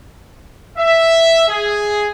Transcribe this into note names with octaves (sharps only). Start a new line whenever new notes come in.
E5
G#4